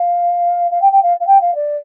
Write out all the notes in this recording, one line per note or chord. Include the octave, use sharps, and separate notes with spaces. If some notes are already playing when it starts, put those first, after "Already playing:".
Already playing: F5
F5
G5
G5
F5
F5
G5
F5
D5